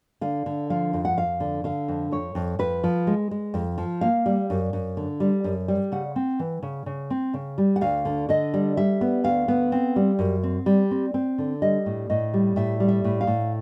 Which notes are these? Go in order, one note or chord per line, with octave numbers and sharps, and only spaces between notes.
D3 F5
D3
F3 F5
F2
F#5
F2 F5
D3
D3 F5
F2
F2 C#5
F2
F2 B4
F3
G#3
G#3
F2
F3
A#3 F5
G3
F#2
F#2
D3
G3
F#2
G3
C#3 F#5
C4
E3
C#3
C#3
C4
C#3
G3
F#5
D2 F5
D3
D3 D#5
G3
G3 E5
B3
D2 F5
B3
C4
G3
F#2
C4
G3
C4
C4
D3
G3 D#5
A2
A2 D#5
G3
A2 E5
G3
E5
A2
F5
A2